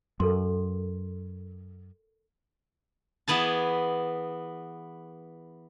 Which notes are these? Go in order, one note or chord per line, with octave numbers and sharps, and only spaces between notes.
F#2 A4 A#4 C6
E3 B3 G#4 A5